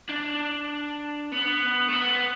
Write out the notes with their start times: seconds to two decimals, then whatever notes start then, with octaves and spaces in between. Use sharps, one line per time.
0.09 D4
1.32 B3
1.89 A3
1.93 B3